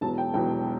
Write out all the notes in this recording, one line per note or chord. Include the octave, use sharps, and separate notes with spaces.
E1 E2 B2 F#3 A5
G5
E1 E2 B2 F#3 G5